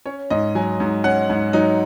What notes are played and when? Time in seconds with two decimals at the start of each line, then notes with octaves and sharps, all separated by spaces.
0.06 C#4 C#5
0.30 G#2 D#5
0.55 F#3 G#5
0.80 G#2
1.04 C#4 F#5
1.30 G#2
1.53 F#3 D#4